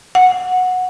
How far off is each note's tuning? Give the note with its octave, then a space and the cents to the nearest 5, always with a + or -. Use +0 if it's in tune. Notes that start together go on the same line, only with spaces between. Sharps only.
F#5 -10